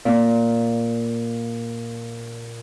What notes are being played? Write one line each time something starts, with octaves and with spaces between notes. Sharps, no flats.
A#2 A#3